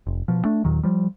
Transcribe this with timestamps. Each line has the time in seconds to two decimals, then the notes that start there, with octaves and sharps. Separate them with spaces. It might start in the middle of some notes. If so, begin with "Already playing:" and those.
0.07 F1
0.28 B2 F3
0.45 A3 D4
0.64 D#2 A#2 D#3 F#3
0.83 F3 G3